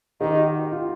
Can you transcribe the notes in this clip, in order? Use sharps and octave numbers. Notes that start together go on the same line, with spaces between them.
D#3 G4
F#4
F#4
F4